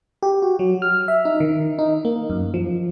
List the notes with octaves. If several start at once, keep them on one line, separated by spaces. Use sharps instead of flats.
G4
F#4
F#3
F6
E5
D#4
D#3
D#4
A#3
F#2
F3